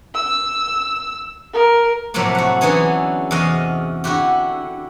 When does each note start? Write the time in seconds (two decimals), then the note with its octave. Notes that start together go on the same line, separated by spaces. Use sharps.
0.15 E6
1.54 A#4
2.14 A2 C3 F3 F#3 A3 A#3
2.35 F#4 F#5
2.61 D3 E3 F#3 B3 C#4 G#4
3.31 E2 C3 F#4 D#5 F5
4.04 D3 E4 F#4 G4